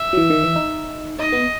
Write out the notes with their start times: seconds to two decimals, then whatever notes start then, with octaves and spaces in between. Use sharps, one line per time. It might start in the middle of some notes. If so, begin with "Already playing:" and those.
Already playing: E5
0.13 F#3
0.17 E3
0.30 D#3
0.43 E3
0.56 D#4
1.19 D#4 D#5
1.32 B3